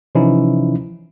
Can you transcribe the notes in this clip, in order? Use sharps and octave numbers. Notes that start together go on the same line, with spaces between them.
C3 E3 F3 C#4 D#4 E4